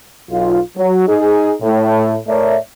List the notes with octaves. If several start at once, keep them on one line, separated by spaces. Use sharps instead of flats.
B1 F4
F#3
D#4 G#4
A2
A2 A3 A#4 C#5 D5 E5